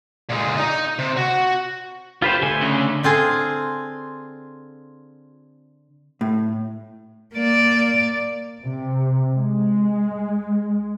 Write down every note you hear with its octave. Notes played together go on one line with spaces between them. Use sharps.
A#2 G#3
D#4 D#5
C3
F#4
D3 F4 G4 B4 C5
D3 A3 G#5 C6
C#3
D3 C4 F4 G#4
A2
A#3 D5
C3
G#3